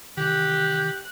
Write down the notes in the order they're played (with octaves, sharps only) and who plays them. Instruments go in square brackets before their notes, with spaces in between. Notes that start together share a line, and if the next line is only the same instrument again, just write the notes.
[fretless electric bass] C3 D#3 E3 [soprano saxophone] G4 [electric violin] F#6 [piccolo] G6